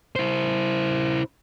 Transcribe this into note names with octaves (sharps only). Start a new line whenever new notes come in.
E4 C5